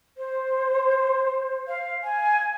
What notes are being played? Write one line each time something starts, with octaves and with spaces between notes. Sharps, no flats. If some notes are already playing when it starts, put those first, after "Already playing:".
C5
F5
G#5